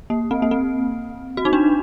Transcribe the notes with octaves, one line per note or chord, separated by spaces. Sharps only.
A#3
C4
A#3
C4
F#4
D#4
D4